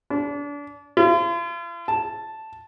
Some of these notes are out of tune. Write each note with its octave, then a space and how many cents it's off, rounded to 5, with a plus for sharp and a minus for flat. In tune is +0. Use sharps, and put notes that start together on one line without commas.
D4 -30
F4 -45
A5 +0